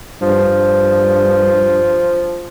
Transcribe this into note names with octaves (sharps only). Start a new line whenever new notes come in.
G2 F3